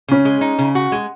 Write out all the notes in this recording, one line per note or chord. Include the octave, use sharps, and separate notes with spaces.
C#3 C#4
G#3
D#4
C#3
F#4
G#3